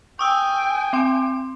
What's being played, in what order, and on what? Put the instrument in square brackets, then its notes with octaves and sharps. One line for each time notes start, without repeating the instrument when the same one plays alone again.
[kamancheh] G5 G#5 [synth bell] C#6 D#6 E6
[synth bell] C4 C6